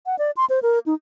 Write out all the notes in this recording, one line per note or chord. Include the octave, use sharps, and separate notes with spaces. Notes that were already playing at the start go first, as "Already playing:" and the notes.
F#5
D5
C6
C5
A#4
D#4